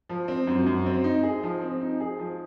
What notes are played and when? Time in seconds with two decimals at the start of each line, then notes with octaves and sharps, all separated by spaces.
0.09 F3
0.28 C4
0.47 F#2
0.66 F#2
0.86 C4
1.04 D#4
1.23 G#4
1.43 F3
1.62 C4
1.81 D#4
2.00 G#4
2.19 F3